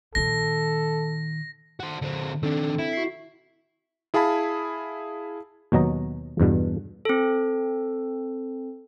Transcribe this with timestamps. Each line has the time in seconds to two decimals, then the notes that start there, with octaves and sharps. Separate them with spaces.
0.15 A#2 D#3 A4 A#6
1.80 F#4 C5
2.02 D3 C4
2.43 D#3 C4 D4 A4
2.79 E4
2.93 F#4 C7
4.14 E4 G#4 F5 A5 B5
5.72 D#2 B2 F#3 D#5 A#5
6.40 E2 G2 B2
7.05 C4 A4